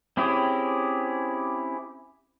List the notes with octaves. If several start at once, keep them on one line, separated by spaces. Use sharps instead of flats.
C4 C#4 E4 G4 G#4